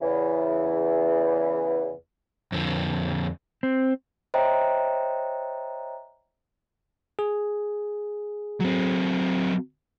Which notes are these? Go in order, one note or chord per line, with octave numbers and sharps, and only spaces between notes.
E2 C#3 E3
F2 D3
C4
C5 C#5 D#5 E5 G5 A#5
G#4
F#3 C4